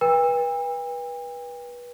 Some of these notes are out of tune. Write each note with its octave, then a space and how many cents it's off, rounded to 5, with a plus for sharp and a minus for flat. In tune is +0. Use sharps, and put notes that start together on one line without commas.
B4 -25 G5 +45